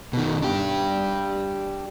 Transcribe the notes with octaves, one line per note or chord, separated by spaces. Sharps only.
B2 D#3
D4 G4